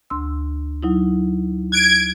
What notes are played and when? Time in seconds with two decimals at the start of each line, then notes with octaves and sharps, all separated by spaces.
0.10 D2 C6 E6
0.83 F#3 D#4 E4
1.72 F#6 G#6 D7